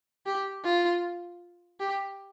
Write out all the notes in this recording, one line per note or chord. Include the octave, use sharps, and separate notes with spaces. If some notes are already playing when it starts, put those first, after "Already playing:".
G4
F4
G4